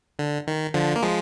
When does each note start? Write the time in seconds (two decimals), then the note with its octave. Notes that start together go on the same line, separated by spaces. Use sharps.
0.19 D3
0.47 D#3
0.74 D3 F3
0.96 A#3
1.02 F3 G#3